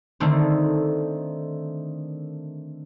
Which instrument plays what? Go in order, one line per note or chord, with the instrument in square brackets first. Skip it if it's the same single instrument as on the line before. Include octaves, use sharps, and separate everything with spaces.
[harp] D3 D#3 A3 C4